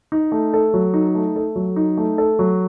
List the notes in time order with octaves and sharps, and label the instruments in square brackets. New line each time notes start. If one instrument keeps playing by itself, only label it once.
[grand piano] D#4
A3
A4
F#3
D#4
A3
A4
F#3
D#4
A3
A4
F#3